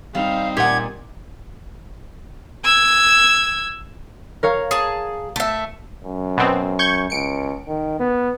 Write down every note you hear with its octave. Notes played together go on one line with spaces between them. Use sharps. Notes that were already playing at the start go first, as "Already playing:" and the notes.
G3 C4 D#4 F5
A#2 G4 F#5 G#6
E6 G#6
A#4 C#5 F5
G#4 A5
A3 E5
F#2
B2 C4
C#6 G6 G#6
C#2 C#7 D7
D#3
B3